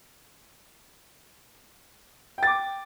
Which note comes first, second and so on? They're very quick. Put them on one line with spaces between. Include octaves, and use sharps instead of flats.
G5 A6 D6